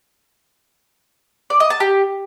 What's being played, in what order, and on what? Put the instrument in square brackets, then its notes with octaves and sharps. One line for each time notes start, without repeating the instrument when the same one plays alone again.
[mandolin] D5
D#5
A5
G4